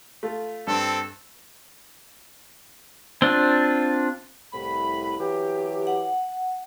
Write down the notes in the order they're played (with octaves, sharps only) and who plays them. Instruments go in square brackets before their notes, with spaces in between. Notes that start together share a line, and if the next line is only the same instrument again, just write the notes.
[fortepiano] A3 F4
[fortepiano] G2 [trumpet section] C4 A4
[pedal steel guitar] C4 D4 F4
[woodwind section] C2 A2 B5
E3 F#3 G4
[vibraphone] F#5